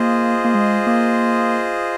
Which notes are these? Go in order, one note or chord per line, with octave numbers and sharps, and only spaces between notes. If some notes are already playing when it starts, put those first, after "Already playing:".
Already playing: A#3 F4 G#4 C5 D#5
A#3
G#3
A#3